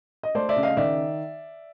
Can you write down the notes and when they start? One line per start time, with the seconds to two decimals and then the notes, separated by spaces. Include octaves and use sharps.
0.23 D#5
0.35 A3 C5 D5
0.49 D5 E5
0.56 C#3
0.63 D#5 F5
0.77 D#3 D5 E5